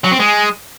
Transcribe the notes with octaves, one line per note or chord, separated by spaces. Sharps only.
F#3
C4
G#3